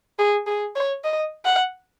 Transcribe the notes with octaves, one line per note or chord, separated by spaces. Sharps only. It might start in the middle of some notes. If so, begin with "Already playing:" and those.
G#4
G#4
C#5
D#5
F#5